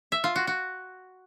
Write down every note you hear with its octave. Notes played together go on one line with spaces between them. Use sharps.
E5
F4
F#4
F#4